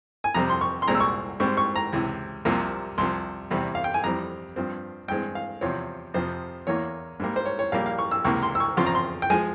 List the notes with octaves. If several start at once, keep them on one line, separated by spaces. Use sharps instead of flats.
G#5
F2 C3 G3 C4 A#5
C6
C#6
C6
C2 A#2 G#3 C4 A#5
E6
C#6
G#2 G3 C4 C#6
C#6
A#5
C#2 C3 E3
C2 C3 F3 A#3
C2 C3 F3 C6
E2 C3 G3 C4
F5
G5
G#5
F2 E3 G3 C4 A#5
G2 F3 C4
G2 E3 G#3 C4 G5
F5
E2 C3 F3 C4 C#5
F2 C3 F3 C4 C5
E2 E3 A#3 C#5
G#2 G3 A#3
C5
C#5
C#5
A#1 A#2 G3 A#3 F5
F5
C#6
E6
C#2 C3 E3 A#3 C#6
C6
E6
C#6
E2 C#3 F3 C4 C6
A#5
C6
G5
F3 G#3 G#5